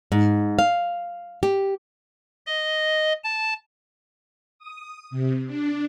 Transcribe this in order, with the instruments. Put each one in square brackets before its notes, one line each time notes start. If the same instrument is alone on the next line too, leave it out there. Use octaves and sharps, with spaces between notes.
[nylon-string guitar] G#2
F5
G4
[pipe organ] D#5
A5
[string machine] D#6
C3
D4